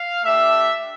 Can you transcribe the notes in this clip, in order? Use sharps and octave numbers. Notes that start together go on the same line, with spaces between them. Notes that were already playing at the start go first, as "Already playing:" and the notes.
Already playing: F5
A3 D4 G4 E5